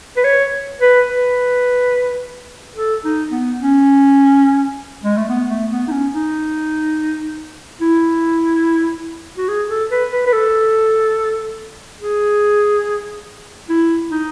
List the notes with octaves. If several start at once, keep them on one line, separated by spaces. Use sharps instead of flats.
B4
C#5
B4
B4
A4
D#4
B3
C#4
G#3
A3
B3
A3
B3
D#4
C#4
D#4
E4
F#4
G#4
A4
B4
B4
B4
A4
G#4
E4
D#4